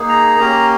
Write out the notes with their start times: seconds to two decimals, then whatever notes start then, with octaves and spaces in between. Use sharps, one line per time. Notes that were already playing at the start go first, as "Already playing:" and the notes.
Already playing: A#3 D#4 G#4
0.09 A#5
0.40 A#3 C#4 G4